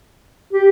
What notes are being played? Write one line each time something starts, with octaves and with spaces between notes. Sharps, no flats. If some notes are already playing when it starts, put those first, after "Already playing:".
G4